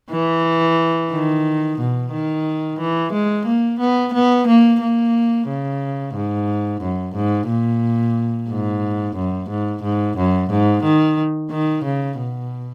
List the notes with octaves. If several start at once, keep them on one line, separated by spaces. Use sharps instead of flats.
E3
D#3
B2
D#3
E3
G#3
A#3
B3
B3
A#3
A#3
C#3
G#2
F#2
G#2
A#2
G#2
F#2
G#2
G#2
F#2
G#2
D#3
D#3
C#3
B2